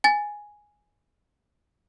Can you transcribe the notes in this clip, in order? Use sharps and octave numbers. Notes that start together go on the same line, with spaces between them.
G#5 A6